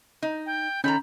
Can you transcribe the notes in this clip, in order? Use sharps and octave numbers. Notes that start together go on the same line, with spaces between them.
D#4
G5
D#3 C#4 A4 A#5 B5 G6